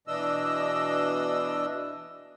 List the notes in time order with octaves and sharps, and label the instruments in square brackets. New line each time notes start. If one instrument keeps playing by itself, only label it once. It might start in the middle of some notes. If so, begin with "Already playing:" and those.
[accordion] B2 E3 D4 D#5 E6